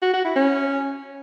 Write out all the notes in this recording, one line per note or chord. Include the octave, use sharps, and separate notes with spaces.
F#4
F#4
E4
C#4